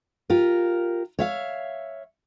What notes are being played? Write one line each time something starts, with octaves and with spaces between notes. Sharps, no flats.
F4 G4 A#4
C#5 E5 F5